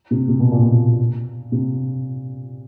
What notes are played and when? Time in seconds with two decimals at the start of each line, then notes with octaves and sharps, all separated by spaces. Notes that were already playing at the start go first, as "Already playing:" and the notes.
0.11 C3
0.28 C3
0.40 B2
0.51 A#2
0.63 B2
1.52 C3